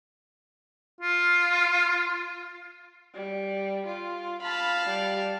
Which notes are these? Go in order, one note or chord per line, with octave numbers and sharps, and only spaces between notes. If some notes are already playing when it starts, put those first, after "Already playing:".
F4
G3
F4
F5 A5 B5
G3